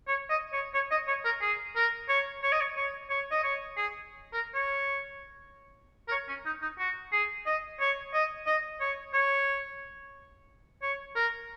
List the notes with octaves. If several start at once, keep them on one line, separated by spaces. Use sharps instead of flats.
C#5
D#5
C#5
C#5
D#5
C#5
A#4
G#4
A#4
C#5
C#5
D#5
C#5
C#5
C#5
D#5
C#5
G#4
A#4
C#5
A#4
C#5
C#4
D#4
D#4
F#4
G#4
D#5
C#5
D#5
D#5
C#5
C#5
C#5
A#4